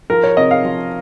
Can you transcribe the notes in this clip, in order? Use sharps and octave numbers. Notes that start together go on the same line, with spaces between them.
F3 A#4
C#5
C3 D#5
F5
F3